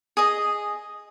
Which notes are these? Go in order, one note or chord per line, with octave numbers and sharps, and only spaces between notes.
G#4 D#5